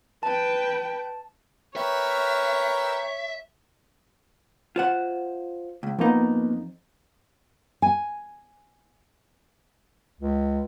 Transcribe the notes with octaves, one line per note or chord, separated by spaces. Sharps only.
B4 G5 A5
A#4 B4 C#5 E5 G5
F4 C5 F#5
C#2
F2 F3 A#3 B3 D#4
G#5
C#2